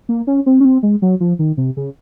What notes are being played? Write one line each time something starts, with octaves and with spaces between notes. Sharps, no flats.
A#3
C#4
C4
C#4
C4
G#3
F#3
F3
D#3
C3
C#3